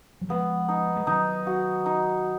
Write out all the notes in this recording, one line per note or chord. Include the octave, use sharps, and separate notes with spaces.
F#3
F3 G#3 B3
D#4
G#3
D#3 F#3 D#4
F#4
D#4